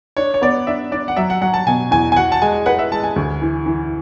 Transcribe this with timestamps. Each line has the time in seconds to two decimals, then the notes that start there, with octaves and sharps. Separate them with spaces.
0.17 D4 C#5
0.34 C#5
0.41 B3 D5
0.67 D4 E5
0.92 D4 D5
1.08 F#5
1.17 F#3 E5
1.30 F#5
1.41 F#3 F#5
1.54 A5
1.67 B2 G#5
1.91 E2 G#5
2.12 G#5
2.16 F#4 F#5
2.32 A5
2.42 G#3 G#5
2.66 B4 F#5
2.79 E5
2.92 G#3 A5
3.04 G#5
3.16 D2
3.41 E3
3.66 E3